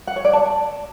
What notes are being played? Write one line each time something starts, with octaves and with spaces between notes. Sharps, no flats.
F#5
C#5
D5
A5